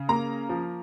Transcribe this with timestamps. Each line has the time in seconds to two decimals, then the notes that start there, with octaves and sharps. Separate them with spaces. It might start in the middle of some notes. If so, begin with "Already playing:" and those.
Already playing: C#3
0.09 A#3 A#5
0.49 F3